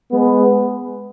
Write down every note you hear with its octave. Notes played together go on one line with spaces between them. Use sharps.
G#3 B3 G#4 B4